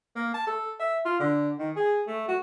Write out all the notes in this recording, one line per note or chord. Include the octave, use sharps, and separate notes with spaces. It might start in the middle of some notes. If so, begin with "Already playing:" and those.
A#3
A5
A4
E5
F4
D3
D#3
G#4
A3
F#4